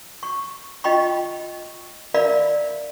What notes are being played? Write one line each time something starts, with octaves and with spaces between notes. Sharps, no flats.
C#6
F4 D#5 G5 B5 C#6
A#4 D5 E5 F5 B5